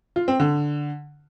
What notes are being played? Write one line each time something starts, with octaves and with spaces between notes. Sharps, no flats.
F4
C4
D3